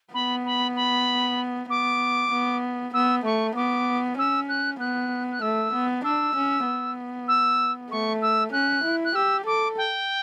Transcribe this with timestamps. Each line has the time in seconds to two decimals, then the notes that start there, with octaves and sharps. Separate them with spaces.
0.14 B3 B5
0.45 B5
0.75 B5
1.69 B3 D6
2.31 B3
2.93 B3 E6
3.24 A3 C#6
3.55 B3 D6
4.18 C#4 E6
4.48 F#6
4.80 B3 F#6
5.31 F#6
5.41 A3 E6
5.73 B3
6.04 D4 E6
6.35 C#4
6.66 B3
7.28 E6
7.90 A3 C#6
8.21 E6
8.52 C#4 F#6
8.84 E4
9.04 F#6
9.15 G4 E6
9.46 A4 D6
9.77 G5